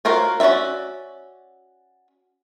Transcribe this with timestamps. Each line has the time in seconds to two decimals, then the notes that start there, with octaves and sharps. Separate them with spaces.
0.05 F4 F#4 A#4 C5 C#5
0.40 C#4 F#4 C#5 D5 E5